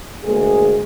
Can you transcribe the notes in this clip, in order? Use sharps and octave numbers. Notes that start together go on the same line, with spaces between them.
D2 G#3 A#3 G#4